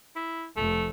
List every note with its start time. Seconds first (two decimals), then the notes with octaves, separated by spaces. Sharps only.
0.16 E4
0.56 F1 A3